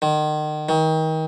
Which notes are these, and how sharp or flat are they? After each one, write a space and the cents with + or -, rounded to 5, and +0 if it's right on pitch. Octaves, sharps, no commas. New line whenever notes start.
D#3 -35
D#3 +30